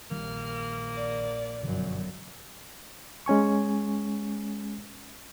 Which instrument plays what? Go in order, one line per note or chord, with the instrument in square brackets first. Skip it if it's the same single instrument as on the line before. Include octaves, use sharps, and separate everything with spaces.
[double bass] A#1 [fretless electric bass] D#3 G3 [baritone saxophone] A#3 [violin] F6
[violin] D5
[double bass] G1 F#2 [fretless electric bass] B2 D3 F3
[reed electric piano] G#3 C#4 G#5 C#6